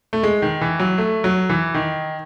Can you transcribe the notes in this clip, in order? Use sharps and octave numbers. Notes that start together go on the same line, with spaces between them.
A3
G#3
D#3
E3
F#3
A3
F#3
E3
D#3